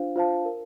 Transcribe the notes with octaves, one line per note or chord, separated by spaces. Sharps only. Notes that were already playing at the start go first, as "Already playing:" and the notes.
Already playing: D4 F4 C5 F5
F4 C5 F5 A5
A#4